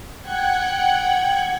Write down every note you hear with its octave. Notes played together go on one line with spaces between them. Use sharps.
F#5 G5 F#6 G#6